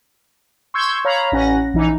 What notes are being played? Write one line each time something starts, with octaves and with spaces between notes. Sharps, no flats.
C6 C#6 E6 G6 G#6
C#5 F5 A#5 B5
A1 C#4 F#5 A#6
A#1 E3 D#4